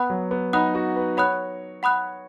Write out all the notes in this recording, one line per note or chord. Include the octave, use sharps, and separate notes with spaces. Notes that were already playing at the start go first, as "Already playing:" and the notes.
Already playing: B3 F#5 B5 D#6 F#6
F#3
B3
D#4 F#5 B5 D#6 F#6
F#4
B4
C#5 F#5 B5 D#6 F#6
F#5 B5 D#6 F#6